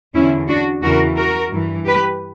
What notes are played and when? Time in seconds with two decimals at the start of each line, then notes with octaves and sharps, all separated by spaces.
0.14 E2 D3 C#4 E4
0.48 D4 F#4
0.83 E2 C#3 E3 F#4 A#4
1.17 F#4 A#4
1.52 G2 E3
1.86 G4 B4